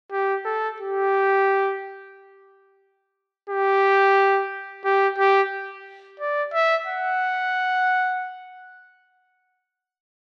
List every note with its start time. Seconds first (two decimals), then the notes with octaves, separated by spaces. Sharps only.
0.11 G4
0.45 A4
0.80 G4
3.49 G4
4.84 G4
5.18 G4
6.19 D5
6.53 E5
6.86 F#5